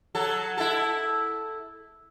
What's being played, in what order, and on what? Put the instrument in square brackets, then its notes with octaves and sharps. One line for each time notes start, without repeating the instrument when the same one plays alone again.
[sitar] F#3 A4
E4 A4